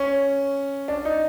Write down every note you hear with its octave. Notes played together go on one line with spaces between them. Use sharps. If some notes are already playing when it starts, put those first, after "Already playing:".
Already playing: C#4
D4
D#4